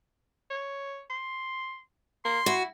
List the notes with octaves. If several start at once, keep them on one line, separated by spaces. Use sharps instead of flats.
C#5
C6
A#3 C6
E4 F#4